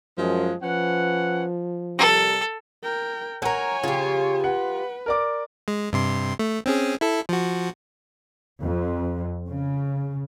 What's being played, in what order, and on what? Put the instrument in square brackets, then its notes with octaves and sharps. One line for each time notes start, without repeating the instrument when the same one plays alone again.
[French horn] F#2 [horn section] F3 G#3
[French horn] F3 [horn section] C#4 B4 F#5
[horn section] C3 G3 A#4 [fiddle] A4
[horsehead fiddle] A#4 G5
[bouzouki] A4 A#4 [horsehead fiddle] C#5 G#5 [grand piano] F#5 A#5
[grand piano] C#3 [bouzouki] F4 G4
[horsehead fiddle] B4 [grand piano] F#5
[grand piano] A#4 D5 D6
[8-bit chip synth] G#3
G2 C3 C6
A3
C4 C#4 G#4
E4 A4
F3 F#4
[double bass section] F2
C#3